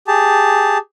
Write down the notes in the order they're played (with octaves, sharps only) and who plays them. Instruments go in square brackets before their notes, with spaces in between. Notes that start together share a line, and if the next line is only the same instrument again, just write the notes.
[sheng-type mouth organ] G4 G#4 A5